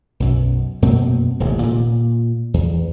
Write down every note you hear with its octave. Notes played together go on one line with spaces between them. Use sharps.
B1 F#2
F#2 B2 A#3 C4
D#1 A1 C3
A#2
E2